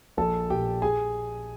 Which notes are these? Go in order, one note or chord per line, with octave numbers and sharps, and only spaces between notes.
A#1 A4 A5
A#2 G4 G5
G#4 G#5